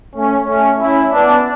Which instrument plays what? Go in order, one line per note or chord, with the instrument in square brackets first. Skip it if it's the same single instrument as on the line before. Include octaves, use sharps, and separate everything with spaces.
[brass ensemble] A3 C#4
A3 C#4
C#4 E4
B3 D4